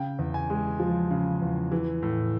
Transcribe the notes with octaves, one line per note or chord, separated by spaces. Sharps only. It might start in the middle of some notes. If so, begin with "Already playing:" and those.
Already playing: C#3 G5
E2
G#5
G#3
F3
C#3
E2
E3
A2